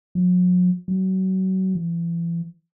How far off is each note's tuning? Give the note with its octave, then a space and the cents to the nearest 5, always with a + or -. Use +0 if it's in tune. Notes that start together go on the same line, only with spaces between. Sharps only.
F#3 -45
F#3 +30
E3 +40